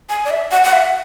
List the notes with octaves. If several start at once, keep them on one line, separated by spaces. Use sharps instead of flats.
G#5
D5
E5
F#5
F#5
E5